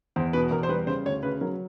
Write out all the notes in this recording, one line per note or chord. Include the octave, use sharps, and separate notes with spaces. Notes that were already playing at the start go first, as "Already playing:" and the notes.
E2 C5
B2 B4
E2 A#4
C5
G3 B4
C#3 C5
D2 C#5
C#3 B4
F#3 A#4